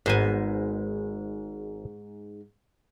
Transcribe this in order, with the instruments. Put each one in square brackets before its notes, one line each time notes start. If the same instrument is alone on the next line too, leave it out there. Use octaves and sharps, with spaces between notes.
[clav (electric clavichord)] G#1 C5 G#5 [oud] G#2 B3